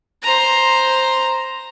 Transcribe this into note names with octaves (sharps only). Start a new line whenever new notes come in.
C5 A#5